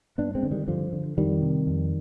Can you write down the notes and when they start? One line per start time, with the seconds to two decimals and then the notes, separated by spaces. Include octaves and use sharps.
0.18 G2 B3 D4
0.35 G#3 C4
0.43 D3
0.51 D#3 G3
0.68 G2 D3 F3
0.93 D3
1.17 F2 D#3 G3
1.42 C3
1.67 F2